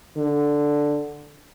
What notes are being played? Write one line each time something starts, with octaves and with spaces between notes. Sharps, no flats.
D3